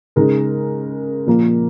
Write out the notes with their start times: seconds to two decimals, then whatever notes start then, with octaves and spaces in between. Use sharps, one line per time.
0.16 C#3 G#3 D#4 A#4
1.27 A#2 F3 A#3 F4 A#4